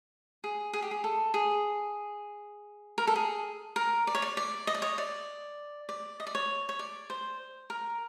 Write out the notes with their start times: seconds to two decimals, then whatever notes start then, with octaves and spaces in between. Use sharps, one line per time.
0.44 G#4
0.73 G#4
0.82 G4
0.91 G#4
1.04 A4
1.34 G#4
2.98 A#4
3.07 A4
3.16 G#4
3.76 A#4
4.07 D5
4.15 C#5
4.22 D5
4.37 D5
4.67 D#5
4.74 D5
4.82 C#5 D#5
4.98 D5
5.89 D5
6.20 D#5
6.27 D5
6.35 C#5
6.69 C#5
6.79 D5
7.10 C5
7.70 A#4